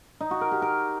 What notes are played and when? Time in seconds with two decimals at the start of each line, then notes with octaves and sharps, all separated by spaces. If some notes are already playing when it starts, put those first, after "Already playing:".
0.21 D#4
0.31 F#4
0.41 A#4
0.52 G4
0.62 A#4